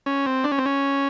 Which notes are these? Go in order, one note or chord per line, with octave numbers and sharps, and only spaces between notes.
C#4
C4
D4
C#4
C4
C#4